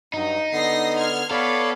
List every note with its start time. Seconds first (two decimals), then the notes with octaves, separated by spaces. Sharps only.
0.14 G2 F#3 D#4
0.53 D3 B3 A#6 C7
0.96 C6 F6 G#6
1.31 B3 A4 C#5 D5 F5 B5